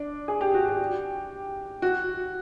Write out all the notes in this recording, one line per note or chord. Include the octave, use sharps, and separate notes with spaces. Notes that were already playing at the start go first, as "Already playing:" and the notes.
Already playing: D4
G#4
G4
F#4
G4
F#4